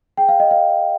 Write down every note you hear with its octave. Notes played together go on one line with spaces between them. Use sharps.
G#4 G5
F5
D#5
C5 F5